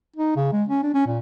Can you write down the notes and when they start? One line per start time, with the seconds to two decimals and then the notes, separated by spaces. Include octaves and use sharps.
0.16 D#4
0.36 C#3
0.53 G#3
0.69 C#4
0.83 D4
0.94 C#4
1.07 A#2